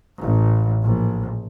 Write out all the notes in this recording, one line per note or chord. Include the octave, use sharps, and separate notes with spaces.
A1
A#1